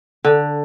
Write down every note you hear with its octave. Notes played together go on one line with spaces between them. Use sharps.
D3